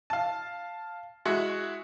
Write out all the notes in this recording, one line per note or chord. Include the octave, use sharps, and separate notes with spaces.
F5 A5
G#3 E4 F#4